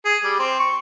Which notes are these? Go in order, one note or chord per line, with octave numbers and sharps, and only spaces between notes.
G#4
G3
C4
C#6